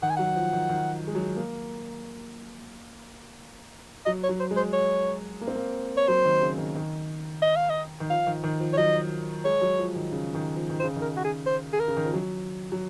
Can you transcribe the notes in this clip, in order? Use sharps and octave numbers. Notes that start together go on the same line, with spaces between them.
D#3 F#5
G#5
F#3 F#5
F3
D#3
D#3
G#3
F#3
A#3
F#3 D#5
C#5
F#3
C5
G#3
C5
C#5
A#3
C4
A#3
C#5
F#3 C5
D#3
C#3
D#3
D#3
D#5
F5
D#5
D#3
F3 F5
D#3
D#3
F3
C#5
F#3 D#5
G#3 C#5
F#3
F3
D#3
C#3
D#3
F3
D#3
C5
C#3
D#3
A#4
F#4
G#4
C5
G#4
A#4
C#3
D#3
F3
F#3
F#3